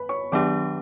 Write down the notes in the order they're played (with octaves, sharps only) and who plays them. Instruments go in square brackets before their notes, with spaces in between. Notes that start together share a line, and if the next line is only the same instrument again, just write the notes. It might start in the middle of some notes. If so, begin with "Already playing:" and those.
Already playing: [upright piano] B4 B5
C#5 C#6
[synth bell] D#3 F#3 B3 D4 G4 [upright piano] D5 D6